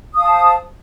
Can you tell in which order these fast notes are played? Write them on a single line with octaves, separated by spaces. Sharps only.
D#6 F5 A5 C5